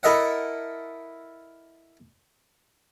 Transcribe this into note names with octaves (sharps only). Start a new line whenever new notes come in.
E4 A4 A#4 D#5 E5 F#5